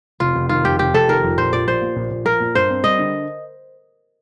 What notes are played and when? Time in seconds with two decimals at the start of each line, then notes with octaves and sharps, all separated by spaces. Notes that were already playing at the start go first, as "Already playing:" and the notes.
0.20 F1 F4
0.35 F1
0.49 D#3 F4
0.65 F2 G4
0.79 F1 G4
0.94 F1 A4
1.08 D#3 A#4
1.23 F2
1.37 A#1 C5
1.53 A#1 D5
1.68 F3 C5
1.82 A#2
1.96 A#1
2.11 A#1
2.25 F3 A#4
2.40 A#2
2.55 G2 C5
2.70 C4
2.84 G3 D#5
2.99 D3